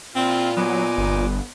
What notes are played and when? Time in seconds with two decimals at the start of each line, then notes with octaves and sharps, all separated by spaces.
0.16 A#2 C4 E4 F4
0.57 F#3 B3 D#4 G#5 D6
0.98 G1